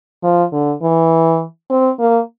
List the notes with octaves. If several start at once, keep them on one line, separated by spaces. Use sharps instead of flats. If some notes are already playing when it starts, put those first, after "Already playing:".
F3
D3
E3
C4
A#3